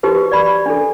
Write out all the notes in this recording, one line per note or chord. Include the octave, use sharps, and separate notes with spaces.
D#4 F#4 G4 B4 C5
D5 B5
D4 A4